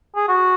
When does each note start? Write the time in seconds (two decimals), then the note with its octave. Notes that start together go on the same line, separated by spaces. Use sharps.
0.16 G#4
0.28 F#4